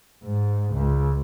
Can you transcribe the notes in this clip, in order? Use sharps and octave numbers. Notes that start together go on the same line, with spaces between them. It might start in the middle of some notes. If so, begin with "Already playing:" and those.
G#2
C#2